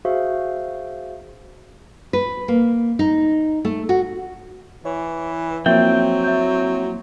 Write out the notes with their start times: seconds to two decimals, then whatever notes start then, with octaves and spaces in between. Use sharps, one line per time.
0.05 F#4 G#4 C5 E5 F5
2.13 B4
2.48 A#3
2.99 D#4
3.65 A3
3.89 F#4
4.85 E3 C#5
5.66 F3 F#3 A#3 C4 E4 E5 G5
6.24 E5 G6